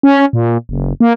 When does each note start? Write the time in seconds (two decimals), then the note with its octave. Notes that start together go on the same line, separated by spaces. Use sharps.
0.03 C#4
0.33 A#2
0.69 F#1
1.00 A#3